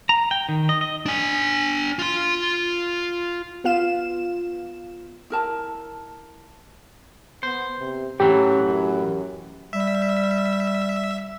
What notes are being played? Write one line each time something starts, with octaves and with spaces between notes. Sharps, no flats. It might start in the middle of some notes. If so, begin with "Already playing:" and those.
A#5
G5
D#3
D#5
D#5
D4 G#5
F4 C6
B3 F4 F5 E7
E4 A#4 A5
B3 C5
C3
A2 E3 F#3 C#4 G4
F#2
G3 E5